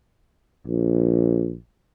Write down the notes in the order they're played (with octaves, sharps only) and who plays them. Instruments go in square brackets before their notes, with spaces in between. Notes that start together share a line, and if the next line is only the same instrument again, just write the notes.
[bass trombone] A#1